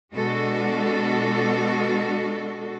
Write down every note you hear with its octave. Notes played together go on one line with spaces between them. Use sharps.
B2 G#3 D4 F#4 A4